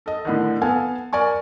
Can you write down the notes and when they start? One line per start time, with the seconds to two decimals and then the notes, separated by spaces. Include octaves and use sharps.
0.06 A4 D#5
0.25 A2 D3 D#3
0.61 B3 A4 F5 G#5
1.13 A#4 D5 G#5 C#6